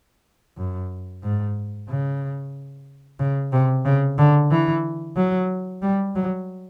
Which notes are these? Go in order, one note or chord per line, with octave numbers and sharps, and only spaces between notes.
F#2
G#2
C#3
C#3
C3
C#3
D3
E3
F#3
G3
F#3